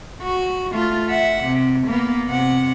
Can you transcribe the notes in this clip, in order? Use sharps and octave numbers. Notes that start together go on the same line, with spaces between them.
F#4
A3 F4
E5 F#5
C3
A#3 B3
C3 F#5